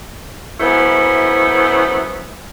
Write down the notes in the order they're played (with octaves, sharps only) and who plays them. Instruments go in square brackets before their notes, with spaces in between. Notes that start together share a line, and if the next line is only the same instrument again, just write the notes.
[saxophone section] F#2 C#3 A3 B3 E4 C5